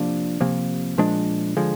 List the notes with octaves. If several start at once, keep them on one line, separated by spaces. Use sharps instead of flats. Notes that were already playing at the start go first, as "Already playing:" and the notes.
Already playing: C3 F3 A#3 D4
C3 F3 A#3
A#2 F3 G#3 D4
D3 F3 G#3